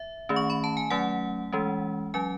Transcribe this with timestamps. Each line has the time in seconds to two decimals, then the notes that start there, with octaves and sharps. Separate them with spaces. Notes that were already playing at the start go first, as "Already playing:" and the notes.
Already playing: E5
0.29 D#3 A3 C#4
0.36 C#6
0.50 B5
0.64 A5
0.77 G#5
0.90 F#3 A3 C#4 F#5
1.52 E3 G#3 C#4
2.14 F#3 C#4 G#5